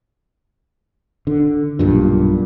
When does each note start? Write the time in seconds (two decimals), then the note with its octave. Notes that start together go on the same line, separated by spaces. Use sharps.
1.27 D3
1.79 B1 G2 A#2